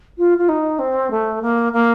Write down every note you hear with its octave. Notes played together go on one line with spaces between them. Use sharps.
F4
F4
D#4
C4
A3
A#3
A#3